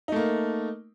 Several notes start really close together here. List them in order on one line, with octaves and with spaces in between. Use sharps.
D#4 A3 A#3